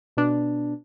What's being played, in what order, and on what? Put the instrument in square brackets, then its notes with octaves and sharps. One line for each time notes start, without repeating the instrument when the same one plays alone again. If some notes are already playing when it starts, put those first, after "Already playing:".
[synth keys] B2 D4